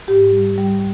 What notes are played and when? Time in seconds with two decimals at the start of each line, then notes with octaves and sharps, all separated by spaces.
0.08 G#2 G4
0.32 G3
0.58 G3